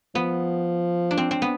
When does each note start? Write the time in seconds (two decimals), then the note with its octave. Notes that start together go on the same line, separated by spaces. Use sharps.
0.15 F3 B3
1.11 D4
1.18 C4
1.31 C4
1.42 B3